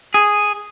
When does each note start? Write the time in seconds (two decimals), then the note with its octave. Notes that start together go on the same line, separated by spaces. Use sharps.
0.14 G#4